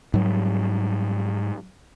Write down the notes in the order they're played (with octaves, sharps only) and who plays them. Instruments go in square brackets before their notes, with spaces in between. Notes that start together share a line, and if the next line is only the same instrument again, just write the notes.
[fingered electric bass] G#2 F#3 G3